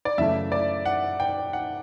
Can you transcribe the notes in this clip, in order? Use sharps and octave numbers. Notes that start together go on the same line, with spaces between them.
D5
F#2 C#3 E3 A3 E5
D5
F#5
G5
F#5